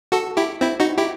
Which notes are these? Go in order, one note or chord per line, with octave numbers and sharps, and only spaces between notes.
F#4 A4
E4 G4
C4 E4
D#4 F#4
E4 G4